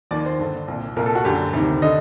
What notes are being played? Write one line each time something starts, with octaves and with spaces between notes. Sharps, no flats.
D#2 D#3 D5
C5
G2 D3
C2 A#2
C2 A#2 A#4
A4
F#4
F#2 D3 G4
D2 C3 D#3
D3 D#5